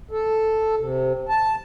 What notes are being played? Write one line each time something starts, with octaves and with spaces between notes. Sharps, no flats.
A4
C3
A5